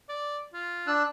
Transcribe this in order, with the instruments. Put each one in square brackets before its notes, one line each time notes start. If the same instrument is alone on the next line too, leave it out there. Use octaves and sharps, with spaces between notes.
[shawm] D5
F4
[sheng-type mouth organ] D4 E6 F#6